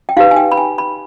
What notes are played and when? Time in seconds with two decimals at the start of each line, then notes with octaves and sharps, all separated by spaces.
0.09 G5
0.17 D#4 G4 B4 F5
0.31 G#5
0.37 G5
0.52 B5
0.57 G#5
0.78 B5